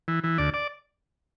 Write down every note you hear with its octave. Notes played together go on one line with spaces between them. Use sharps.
E3
E3
D2 D5
D5